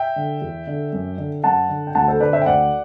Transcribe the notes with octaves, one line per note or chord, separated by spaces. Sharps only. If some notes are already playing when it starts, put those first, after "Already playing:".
Already playing: E5 G5
D3
E2
D3
F#2
D3
F#2 F#5 A5
D3
G5
D2 F#5 A5
A4 C5
D3 B4 D5
C5 E5
G5
D2 D5 F#5